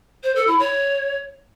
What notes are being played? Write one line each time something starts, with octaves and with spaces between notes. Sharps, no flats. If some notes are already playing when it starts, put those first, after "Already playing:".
C5
A4
E4
C#5